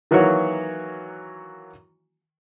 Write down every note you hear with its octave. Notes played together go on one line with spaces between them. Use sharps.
D#3 E3 F#3 A#3 F#4 C#5